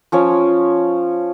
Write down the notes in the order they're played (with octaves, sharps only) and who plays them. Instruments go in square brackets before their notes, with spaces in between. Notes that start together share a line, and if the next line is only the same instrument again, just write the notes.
[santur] F3 C#4 C#5